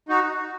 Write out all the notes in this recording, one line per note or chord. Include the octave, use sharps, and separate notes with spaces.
D#4 F#4